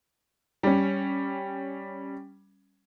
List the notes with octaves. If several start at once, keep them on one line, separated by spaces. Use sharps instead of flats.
G3 C#4